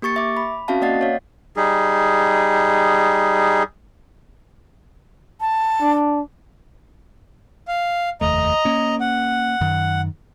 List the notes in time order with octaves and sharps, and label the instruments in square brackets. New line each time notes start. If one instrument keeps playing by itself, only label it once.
[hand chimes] A#3 G4 C#6 A6 C#7
E5 D6
B5
C4 C#4 F#4 E5 F5 A5
A#3 D5 D#5 F#5 A6 C7
C#5 F5
[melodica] G3 D#4 G#4
[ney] A5
[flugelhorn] D4
[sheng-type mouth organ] F5
[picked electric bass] F1 D#2 A3 [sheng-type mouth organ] D#5 A#5
[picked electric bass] A#3 C#4
[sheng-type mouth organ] F#5
[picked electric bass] F#2 D#3